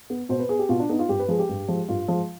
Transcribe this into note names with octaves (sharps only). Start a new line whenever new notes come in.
B3
B2 C5
B4
B3 G#4
G4
B2 F4
D4
B3 D#4
F4
G2 G4
B4
F3 G#3 G#4
G4
G2
F3 G#3
G2 F4
F3 G#3